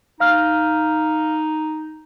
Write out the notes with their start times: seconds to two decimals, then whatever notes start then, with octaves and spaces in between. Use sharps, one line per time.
0.20 D#4 F5 F6